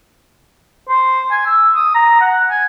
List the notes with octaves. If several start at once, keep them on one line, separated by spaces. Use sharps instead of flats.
C5
G#5
E6
D#6
A#5
F#5
G#5